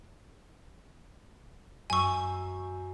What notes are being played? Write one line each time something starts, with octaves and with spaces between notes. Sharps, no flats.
F#2 G#5 C#6 E6